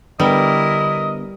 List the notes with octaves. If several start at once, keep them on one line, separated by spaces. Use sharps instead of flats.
D3 G3 B3 E4 A#4 D#5